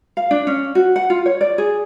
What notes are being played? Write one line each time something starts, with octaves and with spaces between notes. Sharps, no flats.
F5
D4
C#4
F#4
F#5
F4
C#5
D5
G#4